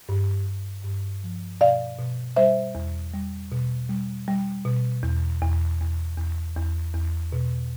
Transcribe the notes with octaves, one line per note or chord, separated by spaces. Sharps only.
G2
G2
G2
F3
B2 D5 F5
B2
G3 C5 E5
E2
G3
B2
G3
G3
B2
E2
E2
E2
E2
E2
E2
B2